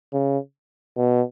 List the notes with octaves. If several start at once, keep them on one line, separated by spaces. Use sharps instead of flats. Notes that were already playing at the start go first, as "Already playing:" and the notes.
C#3
B2